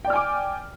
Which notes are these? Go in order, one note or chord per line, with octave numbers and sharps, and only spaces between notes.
D5 G5 G#5 D6 F6